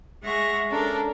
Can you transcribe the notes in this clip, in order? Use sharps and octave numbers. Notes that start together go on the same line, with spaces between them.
G#3 E5 F#5 C#6 F6 A#6
C#4 D4 A4 A#4